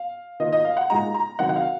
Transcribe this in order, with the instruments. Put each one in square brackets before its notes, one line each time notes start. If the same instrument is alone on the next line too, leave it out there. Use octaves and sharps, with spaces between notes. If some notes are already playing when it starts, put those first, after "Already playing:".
Already playing: [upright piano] F5
D#3 A#3 F4 D#5
D#5
F5
F#5
A#2 G#3 D#4 A#5
A#5
C3 D#3 F#3 F#5
F#5
F5